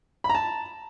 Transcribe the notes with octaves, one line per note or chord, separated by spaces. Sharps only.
B5
A#5
A5